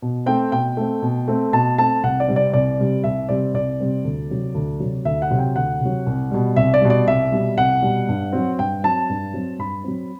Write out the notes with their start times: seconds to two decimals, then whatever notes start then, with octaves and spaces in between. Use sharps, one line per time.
0.02 B2
0.26 A3 C4 G5
0.52 B2 G5
0.77 A3 C4
1.02 B2
1.28 A3 C4
1.53 B2 A5
1.78 A3 C4 A5
2.03 C2 F#5
2.20 D5
2.28 C3 G3 C4
2.36 D5
2.53 C2 D5
2.79 C3 G3 C4
3.04 C2 E5
3.29 C3 G3 C4 D5
3.54 C2 D5
3.80 C3 G3 C4
4.04 D2
4.31 C3 F#3
4.55 D2
4.80 C3 F#3
5.05 D2 E5
5.22 F#5
5.31 C3 F#3
5.39 G5
5.56 D2 F#5
5.81 C3 F#3
6.07 C2
6.31 B2 G3
6.56 C2 E5
6.74 D5
6.81 B2 G3
6.90 D5
7.07 C2 E5
7.32 B2 G3
7.58 C2 F#5
7.82 B2 G3
8.09 G2
8.33 F#3 C4
8.59 G2 G5
8.84 F#3 C4 A5
9.09 G2
9.34 F#3 C4
9.59 G2 B5
9.84 F#3 C4